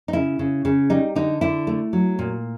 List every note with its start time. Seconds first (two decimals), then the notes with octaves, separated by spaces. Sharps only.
0.08 D#4
0.13 C#3 E4
0.39 C#3
0.65 C#3
0.90 G3 D#4
1.15 D3 D#4
1.41 D3 E4
1.67 A3
1.93 F#3
2.19 A#2